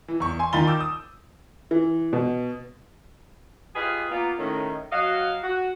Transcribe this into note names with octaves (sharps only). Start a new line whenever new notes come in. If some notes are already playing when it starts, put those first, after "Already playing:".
E3
E2 C#6
G#5 C6
D#2 D#3 F4 B5 A6 G7
D6 E6 G6
D#6
E3
B2
F4 G4 G#4 B4 D#5 F5
A#3 B3 F4
A2 D#3 C#4
F#3 F#4 D#5 F5
F#4